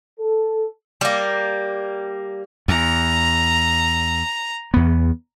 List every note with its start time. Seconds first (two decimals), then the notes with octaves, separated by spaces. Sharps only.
0.19 A4
1.01 G3 A#3
2.68 E2 A#5
4.74 E2 B3